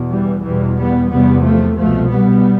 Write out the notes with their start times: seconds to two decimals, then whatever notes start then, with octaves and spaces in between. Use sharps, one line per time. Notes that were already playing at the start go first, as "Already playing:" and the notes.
Already playing: E2 B2
0.09 E3 G3
0.43 E2 B2 E3 G3
0.77 G3 B3
1.10 E2 C3 G3 B3
1.44 F3 A3
1.77 C2 B2 F3 A3
2.10 G3 B3